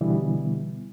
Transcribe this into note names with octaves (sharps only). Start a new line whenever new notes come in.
B2 D3 E3 G3 B3